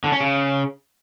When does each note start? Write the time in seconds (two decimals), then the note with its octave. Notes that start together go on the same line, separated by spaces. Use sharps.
0.04 D3
0.12 C#4
0.21 C#3